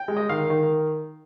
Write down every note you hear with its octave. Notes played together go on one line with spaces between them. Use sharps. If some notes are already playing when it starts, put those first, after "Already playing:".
Already playing: G5
G#3
D#5
D#3 F5
D#3